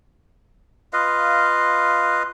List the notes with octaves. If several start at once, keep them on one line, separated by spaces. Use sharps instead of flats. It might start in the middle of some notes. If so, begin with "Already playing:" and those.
F4 B4 D#5 F5